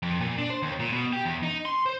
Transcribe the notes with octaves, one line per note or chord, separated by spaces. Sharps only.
F2
A#2
D4
C5
D#2
A#2
B2
G4
E2
D#4
C6
C5